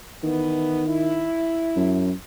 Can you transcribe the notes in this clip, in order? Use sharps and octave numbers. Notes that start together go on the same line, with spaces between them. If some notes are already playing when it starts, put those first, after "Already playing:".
D#3 E3 B3
E4
F#2